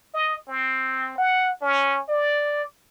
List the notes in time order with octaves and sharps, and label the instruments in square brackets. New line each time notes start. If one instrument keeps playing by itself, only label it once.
[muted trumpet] D#5
C4
F#5
C#4
D5